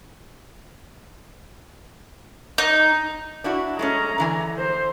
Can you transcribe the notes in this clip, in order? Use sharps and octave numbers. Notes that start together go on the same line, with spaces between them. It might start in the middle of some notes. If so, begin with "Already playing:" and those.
D#4
D4 E4 F#4
G#3 A3 C#4 A#5
D3 E3 G#5
C5